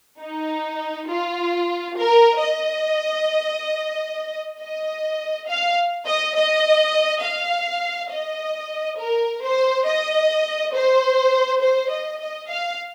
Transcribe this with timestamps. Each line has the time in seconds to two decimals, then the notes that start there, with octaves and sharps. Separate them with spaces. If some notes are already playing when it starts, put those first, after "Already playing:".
0.21 D#4
1.09 F4
1.97 A#4
2.41 D#5
4.60 D#5
5.47 F5
6.06 D#5
6.36 D#5
7.23 F5
8.11 D#5
8.99 A#4
9.43 C5
9.86 D#5
10.74 C5
11.62 C5
11.91 D#5
12.21 D#5
12.50 F5